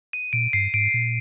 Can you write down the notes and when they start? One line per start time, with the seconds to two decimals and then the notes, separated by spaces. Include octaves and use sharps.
0.13 D#7
0.33 A#2 D7
0.53 G2 C7
0.74 G#2 D7
0.94 A#2